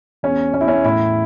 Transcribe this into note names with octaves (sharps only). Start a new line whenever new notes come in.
E2 C#4
E2 C#4
E4
C#4
A2 E4